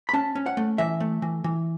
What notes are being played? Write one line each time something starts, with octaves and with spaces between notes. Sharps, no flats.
B5
C#4 A5
C#4
F#5
A3
E3 E5
A3
E3
E3